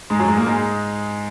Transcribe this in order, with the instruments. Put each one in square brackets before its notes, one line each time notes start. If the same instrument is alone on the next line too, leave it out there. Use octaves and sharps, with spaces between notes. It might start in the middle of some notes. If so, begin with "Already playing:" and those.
[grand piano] G#2 G#3
F#2 F#3
G#2 G#3
A#2 A#3
G#2 G#3